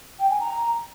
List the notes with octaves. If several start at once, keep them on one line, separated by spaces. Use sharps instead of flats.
G5
G#5
A#5